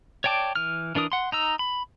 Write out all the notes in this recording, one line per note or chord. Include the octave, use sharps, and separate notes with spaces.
C#5 D5 G5 A5 D6
E3 F6
E3 D4 A#4 D#6
F#5 C6
D#4 A#5 E6
B5